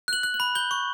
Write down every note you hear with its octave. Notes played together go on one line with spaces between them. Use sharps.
F#6 F#7
F#6
F#7
B5
G6 G7
C#6